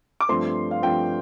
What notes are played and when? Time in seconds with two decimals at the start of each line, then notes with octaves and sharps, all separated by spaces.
0.21 D6
0.29 G2 F3 A3 C4 C6
0.71 F5
0.82 G2 F3 A3 C4 G5